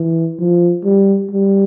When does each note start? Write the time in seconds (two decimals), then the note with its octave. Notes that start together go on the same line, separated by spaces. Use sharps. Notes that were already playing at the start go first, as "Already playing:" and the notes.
Already playing: E3
0.40 F3
0.85 G3
1.31 G3